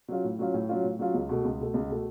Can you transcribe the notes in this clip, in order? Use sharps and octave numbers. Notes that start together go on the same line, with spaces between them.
F#3 C#4 F4
A2
F#3 C#4 F4
A2
F#3 C#4 F4
A2
F#3 C#4 F4
C#2
B2 A3
C#2
B2 A3
C#2
B2 A3